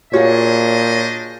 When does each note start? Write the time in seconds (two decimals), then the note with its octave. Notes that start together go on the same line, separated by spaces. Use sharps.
0.13 A#2 D4 F4 F#4 G#4 C5 C#5 D#5